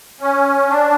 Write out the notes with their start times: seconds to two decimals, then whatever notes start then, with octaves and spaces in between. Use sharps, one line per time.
0.21 C#4
0.70 D4